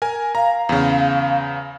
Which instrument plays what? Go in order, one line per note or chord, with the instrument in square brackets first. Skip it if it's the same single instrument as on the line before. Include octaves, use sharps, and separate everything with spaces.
[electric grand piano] A#4 G#5
[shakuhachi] F5 [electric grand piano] A#5
[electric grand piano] E2 C#3